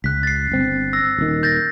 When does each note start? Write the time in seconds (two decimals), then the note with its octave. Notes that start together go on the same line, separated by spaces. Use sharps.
0.04 C#2 F#6 B6
0.23 A6 C7
0.52 G1 C4
0.93 E6 A#6
1.18 D#1 D#3
1.43 G6 A6 A#6